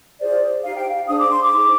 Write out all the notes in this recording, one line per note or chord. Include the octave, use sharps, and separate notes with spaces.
F4 G#4 C5 D5
D#4 G4 C5 F5
G5
F5
D4 G#4 C5 D#6
D6
C6
D6
D#4 G#4 C5